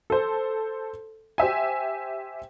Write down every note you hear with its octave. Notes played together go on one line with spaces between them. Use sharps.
A4 C5
G4 C5 E5 G#5